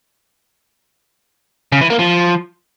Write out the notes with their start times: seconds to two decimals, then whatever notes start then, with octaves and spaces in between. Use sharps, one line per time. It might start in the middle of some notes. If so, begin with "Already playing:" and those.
1.72 C#3
1.81 E3
1.90 A#3
1.99 F3